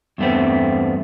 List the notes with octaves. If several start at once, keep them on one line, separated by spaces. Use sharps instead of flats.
E2 G2 A3 B3 C4